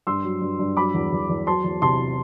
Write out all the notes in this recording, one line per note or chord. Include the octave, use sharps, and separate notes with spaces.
G2 C6 E6
F#3
G2
G2
F#3 B5 D6
E2
E2
E2
F#3 A5 C6
E2
C3 A5 C6